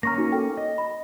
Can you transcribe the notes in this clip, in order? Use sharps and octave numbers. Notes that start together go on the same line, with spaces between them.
A#3 C#4 A#5 C#6 F6 A#6
D#4 F#4
A4 G5
D#5
B5